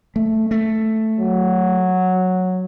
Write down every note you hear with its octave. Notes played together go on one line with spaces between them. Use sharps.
A3
A3
F#3